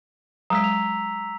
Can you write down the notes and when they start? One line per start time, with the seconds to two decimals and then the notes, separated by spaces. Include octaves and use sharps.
0.50 F#3 G#3 A#5 E6 B6
0.64 F7